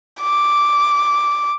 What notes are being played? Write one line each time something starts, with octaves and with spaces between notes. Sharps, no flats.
D6